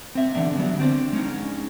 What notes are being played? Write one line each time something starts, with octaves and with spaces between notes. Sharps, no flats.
C4 E5
D3 E3 B3 D4
D3 F#3 G3 B3
C4 D4 B4 C5
G#3 C#4 D#4